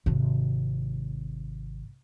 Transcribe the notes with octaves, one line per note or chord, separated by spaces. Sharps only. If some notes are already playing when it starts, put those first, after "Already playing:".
G#1 C3